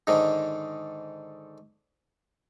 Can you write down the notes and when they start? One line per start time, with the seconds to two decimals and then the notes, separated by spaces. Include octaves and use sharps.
0.07 G#2 D3 D#3